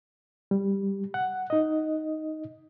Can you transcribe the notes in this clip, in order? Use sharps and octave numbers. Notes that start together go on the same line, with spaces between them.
G3
F#5
D#4 D#5